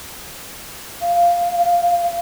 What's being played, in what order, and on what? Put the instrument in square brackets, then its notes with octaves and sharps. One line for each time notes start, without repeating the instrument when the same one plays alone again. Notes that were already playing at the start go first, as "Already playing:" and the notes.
[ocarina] F5